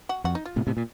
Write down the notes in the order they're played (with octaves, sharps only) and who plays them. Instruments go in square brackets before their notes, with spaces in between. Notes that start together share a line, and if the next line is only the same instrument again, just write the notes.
[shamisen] F#4
[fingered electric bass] F2 [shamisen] F#4
[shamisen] D#4
F4
[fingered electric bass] A2 C3
A2 C3
A#2